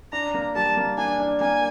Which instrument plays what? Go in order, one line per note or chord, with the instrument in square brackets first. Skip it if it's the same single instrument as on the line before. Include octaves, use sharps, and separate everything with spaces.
[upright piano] D4 [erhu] A#5
[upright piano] A#3
[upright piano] G3 [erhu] A5
[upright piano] A#3
[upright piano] D4 [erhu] G#5
[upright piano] D4
[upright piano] A#3 [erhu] G#5